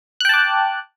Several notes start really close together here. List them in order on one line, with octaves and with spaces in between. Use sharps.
F#6 G5 A5 D6